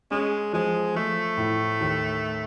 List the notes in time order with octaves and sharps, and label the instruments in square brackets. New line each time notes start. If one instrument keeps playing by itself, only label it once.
[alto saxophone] G#3 [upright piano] C#4
[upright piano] F3 [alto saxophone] G#3
[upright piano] F3 [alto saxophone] A3
[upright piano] A2
D#2